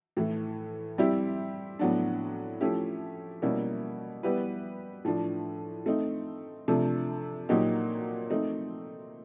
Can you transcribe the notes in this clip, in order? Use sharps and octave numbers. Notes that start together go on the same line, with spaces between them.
A2 E3 A3
G3 C4 E4 G4
A2 F#3 B3 D4
F3 A3 C#4 E4 G4
B2 G3 A#3 C#4 E4
G3 B3 E4 G4 B4
A2 F3 A3 D4
A3 C4 D#4
C3 F3 A3 D4
A#2 F#3 A#3 D#4 G4
A3 C4 D#4